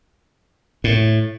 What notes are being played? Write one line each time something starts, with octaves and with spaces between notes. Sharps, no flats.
A2